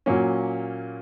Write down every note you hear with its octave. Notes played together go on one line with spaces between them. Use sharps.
A#2 F#3 A#3 C#4